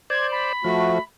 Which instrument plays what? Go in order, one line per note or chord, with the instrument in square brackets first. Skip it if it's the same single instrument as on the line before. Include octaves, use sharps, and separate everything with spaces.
[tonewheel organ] C5 D5 [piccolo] G#6
[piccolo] B5
[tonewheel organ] F3 [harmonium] A3 F#4